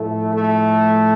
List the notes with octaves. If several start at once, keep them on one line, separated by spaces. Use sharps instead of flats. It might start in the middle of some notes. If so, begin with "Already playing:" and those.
Already playing: A2 F3 A3
A3